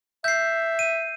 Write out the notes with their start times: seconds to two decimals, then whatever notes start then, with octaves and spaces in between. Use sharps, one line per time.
0.24 E5 G6 C7
0.79 D#7